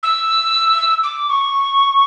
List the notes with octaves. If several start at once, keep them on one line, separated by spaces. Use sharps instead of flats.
E6
D6
C#6